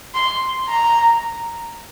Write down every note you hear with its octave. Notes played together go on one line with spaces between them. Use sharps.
C6
A#5